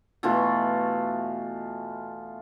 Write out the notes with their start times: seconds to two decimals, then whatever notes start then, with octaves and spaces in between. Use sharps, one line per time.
0.23 B2 E3 A3 F4